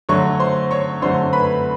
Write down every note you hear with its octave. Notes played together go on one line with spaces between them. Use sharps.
D3 F#3 A3 C#5 C#6
C5 C6
C#5 C#6
D3 F#3 A3 C5 C6
B4 B5